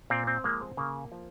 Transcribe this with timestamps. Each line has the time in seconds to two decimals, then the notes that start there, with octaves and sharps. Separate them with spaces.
0.10 A#2 C4
0.27 C4
0.44 F3 G#3 A#3
0.61 C4
0.77 C#3 A#3
1.12 F3